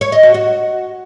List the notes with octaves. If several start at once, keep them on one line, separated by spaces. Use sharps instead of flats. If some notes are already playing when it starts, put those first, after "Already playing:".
C#5
D#5
F#4
F#4